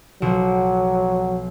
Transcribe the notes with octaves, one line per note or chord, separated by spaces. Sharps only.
B1 F3 F#3 F#4